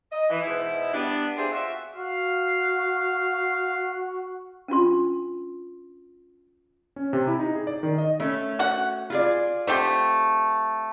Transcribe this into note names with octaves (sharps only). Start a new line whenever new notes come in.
D#5
E3
G#2 B2 B3 E4
G3 B3 D4
C4 E4 F4 G4 G#4 D5
F4 F#4 C5 E5
F#4 F5
C#4 D4 F4 C6
C#4
C3
E4
D#4
G#4
D5
D#3
D#5
A3 C#4
F#4 F#5
F4 G#4 D5
A3 C4 G4